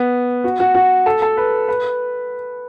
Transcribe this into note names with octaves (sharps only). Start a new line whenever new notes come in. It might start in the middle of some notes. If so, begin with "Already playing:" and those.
Already playing: B3
F#4
F#4
F#4
A4
A4
B4
B4